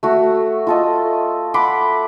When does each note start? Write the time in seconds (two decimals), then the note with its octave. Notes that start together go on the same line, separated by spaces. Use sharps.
0.03 A3 F#4
0.67 F4 A4 D#5
1.54 F#5 B5 C6 D6